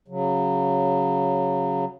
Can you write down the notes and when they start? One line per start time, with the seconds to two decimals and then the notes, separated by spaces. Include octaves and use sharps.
0.08 C#3 F#3